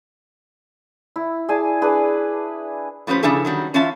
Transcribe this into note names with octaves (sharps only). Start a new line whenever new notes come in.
E4
G#4 D5 G#5 A5
D4 G#4 B4 A5
A2 F3 C#4 G4 B4 C5
C#3 F3 D4 E4 G#4 A4
D#3 F#3 G3
E3 C#4 F4 E5 F5 A5